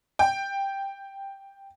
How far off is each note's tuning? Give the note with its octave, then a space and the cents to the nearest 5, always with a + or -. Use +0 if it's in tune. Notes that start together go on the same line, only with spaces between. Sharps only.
G5 +5